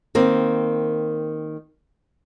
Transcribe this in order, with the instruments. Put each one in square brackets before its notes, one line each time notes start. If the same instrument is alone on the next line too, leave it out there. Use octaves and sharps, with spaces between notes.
[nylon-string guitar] D#3 A#3 C4